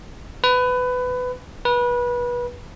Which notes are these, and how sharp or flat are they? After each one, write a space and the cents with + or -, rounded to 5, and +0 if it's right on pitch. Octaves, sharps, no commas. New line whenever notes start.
B4 +20
B4 -25